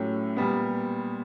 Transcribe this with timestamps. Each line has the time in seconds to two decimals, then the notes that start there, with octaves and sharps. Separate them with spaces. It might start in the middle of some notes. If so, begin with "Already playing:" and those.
Already playing: A2 F#3 A3 C#4 G4
0.37 A#2 G3 B3